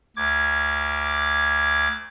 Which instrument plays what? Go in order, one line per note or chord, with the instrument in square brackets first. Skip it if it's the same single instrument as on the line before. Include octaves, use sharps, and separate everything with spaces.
[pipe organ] D2 D6 G#6